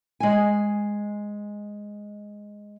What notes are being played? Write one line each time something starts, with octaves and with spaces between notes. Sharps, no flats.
G#3 G#5